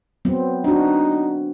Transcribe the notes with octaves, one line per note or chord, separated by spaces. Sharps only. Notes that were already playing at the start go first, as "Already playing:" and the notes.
F#3 B3 C4
D4 D#4 F#4